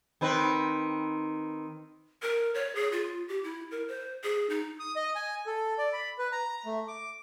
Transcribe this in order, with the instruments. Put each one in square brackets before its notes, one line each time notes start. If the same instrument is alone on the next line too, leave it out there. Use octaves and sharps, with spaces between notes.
[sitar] D#3 C4 B4
[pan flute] A#4
C#5
G#4
F4
G4
E4
A#4
C5
G#4
D#4
[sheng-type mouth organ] D#6
D#5
G#5
A4
D5
B5
B4
A#5
A3
D6